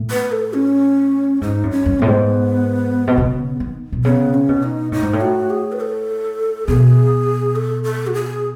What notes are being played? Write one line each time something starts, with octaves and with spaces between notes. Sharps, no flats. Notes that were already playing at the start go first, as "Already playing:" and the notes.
Already playing: A2
B4
A4
C#4
G#2 D#4
F#2
C#4
F#2
A2 B3
G#2
B2
C#3
D#3
B2
C#3 B3
C#4
B2
D#4
A2 D#4
G#2
A2
F#4
G#4
B4
A4
B2 G#4
A4
A4
F#4
G#4